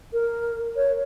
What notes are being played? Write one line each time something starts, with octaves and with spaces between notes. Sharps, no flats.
A#4
C#5